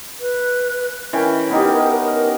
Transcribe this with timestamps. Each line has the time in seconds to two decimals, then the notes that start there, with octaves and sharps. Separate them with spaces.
0.20 B4
1.13 E3 C#4 A#4 G5
1.50 B3 D#4 G4
2.03 A#4